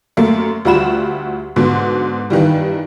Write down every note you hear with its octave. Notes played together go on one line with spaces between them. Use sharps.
F#2 A3 A#3
D2 G3 F4 F#4 B5 E7
G#2 B2 D3
G2 D#3 E3 G3